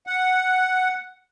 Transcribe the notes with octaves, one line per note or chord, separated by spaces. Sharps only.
F#5